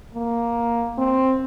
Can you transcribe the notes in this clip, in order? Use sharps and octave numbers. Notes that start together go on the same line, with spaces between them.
A#3
C4